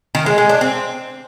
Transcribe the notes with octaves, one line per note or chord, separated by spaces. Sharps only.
D#3
G#3
G#3
D4
C4